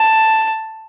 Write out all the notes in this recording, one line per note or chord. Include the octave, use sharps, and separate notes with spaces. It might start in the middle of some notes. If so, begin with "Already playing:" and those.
Already playing: A5